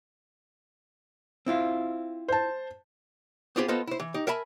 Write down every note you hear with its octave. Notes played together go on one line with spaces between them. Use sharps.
C4 E4 F4
C5 A5
B3 C4 F4 G4 G#4 C5
B3 F4 A4 C5 D#5 F5
E4 C5
E3
D#4 G4
A#4 E5 G#5 A5 B5